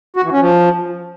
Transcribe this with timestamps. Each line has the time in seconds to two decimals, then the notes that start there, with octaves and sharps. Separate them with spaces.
0.16 F#4
0.24 E3
0.32 C#4
0.40 F3